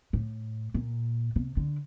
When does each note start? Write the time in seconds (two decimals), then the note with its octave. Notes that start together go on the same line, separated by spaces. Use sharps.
0.13 A2
0.74 A#2
1.36 C3
1.57 D3